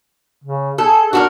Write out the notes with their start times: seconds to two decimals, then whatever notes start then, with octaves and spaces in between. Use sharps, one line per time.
0.44 C#3
0.78 G#4 A4
1.13 D4 F#4 A4 A#4